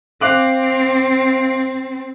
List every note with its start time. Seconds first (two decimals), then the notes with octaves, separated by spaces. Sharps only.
0.21 C4 F5 D6 F#6